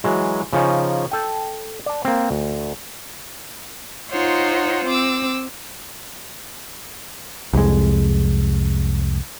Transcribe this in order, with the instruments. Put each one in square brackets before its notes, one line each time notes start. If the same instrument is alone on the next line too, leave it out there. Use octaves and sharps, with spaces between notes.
[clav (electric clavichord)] E3 F#3 G#3
C#3 F3 C#4 D#4
A4 G5
D5 A5
A#3 C4
D2
[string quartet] D#4 F4 C5 C#5 F#5
C4 D6 E6
[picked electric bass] C2 F2 G#3